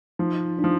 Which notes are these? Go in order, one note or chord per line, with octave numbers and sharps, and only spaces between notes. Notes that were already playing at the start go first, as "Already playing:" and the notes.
F3 D#4
D4
F3 D#4